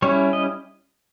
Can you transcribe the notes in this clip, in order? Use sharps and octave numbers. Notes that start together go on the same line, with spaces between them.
G3 C#4 E4 C#5
D#5